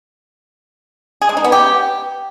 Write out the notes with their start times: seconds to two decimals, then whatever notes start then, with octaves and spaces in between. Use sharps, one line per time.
1.22 G#4
1.29 G#3
1.37 D#4
1.44 B3
1.52 G4